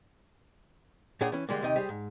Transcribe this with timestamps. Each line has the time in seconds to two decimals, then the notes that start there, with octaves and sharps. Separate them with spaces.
1.21 A#2 D4 G#4 C#5 F#5 G5
1.32 E3 C#4
1.49 D3 G3 G#3 A#3
1.62 D#2 C3 D#4 D#5 G5
1.76 G3 G4 G#4 C5
1.89 G#2